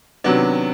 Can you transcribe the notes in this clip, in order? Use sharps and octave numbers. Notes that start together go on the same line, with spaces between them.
C3 D#3 F#3 B3 D4